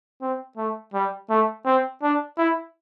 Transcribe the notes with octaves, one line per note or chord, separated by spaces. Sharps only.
C4
A3
G3
A3
C4
D4
E4